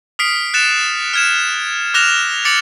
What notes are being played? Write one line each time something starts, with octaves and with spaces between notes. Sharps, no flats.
D#6 F6 B6 C7 D7
F#6 A6 C#7 E7 F7
F6 G#6 E7
D6 F6 F#6 A#6 E7 F7
D6 A6 C#7 D7 F7 F#7